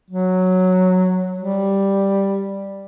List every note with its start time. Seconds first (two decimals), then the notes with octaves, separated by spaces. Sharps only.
0.11 F#3
1.38 G3